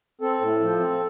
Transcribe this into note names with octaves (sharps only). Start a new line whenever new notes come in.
C4 A4
A2
F3
C4